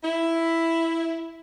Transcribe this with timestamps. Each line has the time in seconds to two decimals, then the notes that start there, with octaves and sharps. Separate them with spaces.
0.04 E4